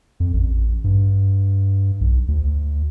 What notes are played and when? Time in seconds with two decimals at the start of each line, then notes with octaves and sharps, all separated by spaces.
0.20 F2
0.33 A1
0.84 G2
2.01 B1
2.28 D2